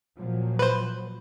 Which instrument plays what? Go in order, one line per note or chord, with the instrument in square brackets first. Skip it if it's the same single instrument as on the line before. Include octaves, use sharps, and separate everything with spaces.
[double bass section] A#2 F3 F#3
[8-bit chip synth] B4 C5